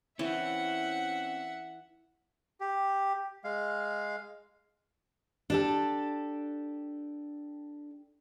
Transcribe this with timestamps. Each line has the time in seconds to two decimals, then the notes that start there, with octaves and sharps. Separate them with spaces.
0.19 E3 C4 C#4 E5 F#5
2.60 G4
3.44 G#3 F5
5.50 D4 G4 A4